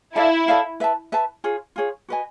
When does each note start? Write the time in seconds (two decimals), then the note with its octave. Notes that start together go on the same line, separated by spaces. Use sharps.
0.15 E4 A4 D5 F5
0.48 A4 D5 F5
0.80 B4 E5 A5
1.12 B4 E5 A5
1.44 F4 G#4 C#5
1.76 F4 G#4 C#5
2.09 F#4 B4 D#5 G#5